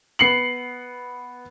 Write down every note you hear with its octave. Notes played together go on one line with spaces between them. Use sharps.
B3 C7 C#7 F#7